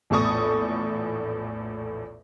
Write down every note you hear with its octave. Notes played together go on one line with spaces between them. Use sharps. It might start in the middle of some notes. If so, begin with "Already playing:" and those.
A#1 E2 A2 A4 C#6 D#6